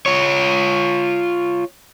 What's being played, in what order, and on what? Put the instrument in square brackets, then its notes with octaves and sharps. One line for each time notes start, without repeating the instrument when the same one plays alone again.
[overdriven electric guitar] F4 C#5